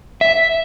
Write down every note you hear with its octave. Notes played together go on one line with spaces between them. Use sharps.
E5